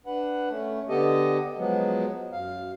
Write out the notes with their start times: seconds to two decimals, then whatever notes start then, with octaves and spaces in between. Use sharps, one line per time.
0.06 D4 B4 F#5
0.50 A3 C#4
0.89 D3 B3 G4 A4 D#5
1.57 F3 F#3 G#3 B3
2.32 F#2 F5